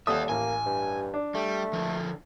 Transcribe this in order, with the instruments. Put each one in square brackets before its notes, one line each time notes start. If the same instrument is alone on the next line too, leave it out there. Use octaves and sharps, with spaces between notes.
[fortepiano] D#2 A4 D#6 [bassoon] G3 [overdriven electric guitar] E5 F#5
[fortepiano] A1 [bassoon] A#3 [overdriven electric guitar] G#5
[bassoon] G2
[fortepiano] D4
[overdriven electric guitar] G3 [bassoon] A3
[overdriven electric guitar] D3 F3